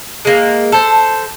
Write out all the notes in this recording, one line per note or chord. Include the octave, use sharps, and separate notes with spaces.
G#3 A#3
A4 C5